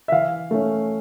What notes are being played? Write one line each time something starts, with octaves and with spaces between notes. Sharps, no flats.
E5
E3 F5
A3 C#4